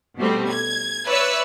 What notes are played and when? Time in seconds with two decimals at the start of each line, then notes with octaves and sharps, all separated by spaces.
0.17 B2 G3 A3 C4
0.50 G#6
1.06 B4 C#5 D5 E5 E6 F#6